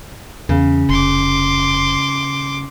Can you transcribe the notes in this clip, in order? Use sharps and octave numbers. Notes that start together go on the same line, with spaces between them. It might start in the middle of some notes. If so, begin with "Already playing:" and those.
E2 C#3
F1 C6 D6